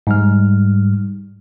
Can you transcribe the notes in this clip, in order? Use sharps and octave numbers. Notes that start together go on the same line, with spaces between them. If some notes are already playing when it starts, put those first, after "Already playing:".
G#2 G3 F6